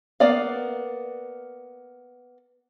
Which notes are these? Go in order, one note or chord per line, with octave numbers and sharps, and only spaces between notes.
A#3 B3 D5 F5